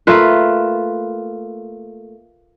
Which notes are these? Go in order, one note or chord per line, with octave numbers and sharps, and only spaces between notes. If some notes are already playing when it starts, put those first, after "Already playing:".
A3 A#3 F4 B4